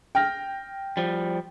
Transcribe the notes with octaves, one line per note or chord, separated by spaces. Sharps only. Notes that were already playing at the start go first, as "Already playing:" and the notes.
G5 F6 A#6
F3 G3